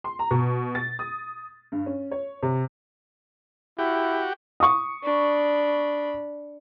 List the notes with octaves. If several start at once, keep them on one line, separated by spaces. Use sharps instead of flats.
C6
A#5
B2
A6
D#6
G2
C#4
C#5
C3
E4 F#4 G4
C#6 D#6
D4 B5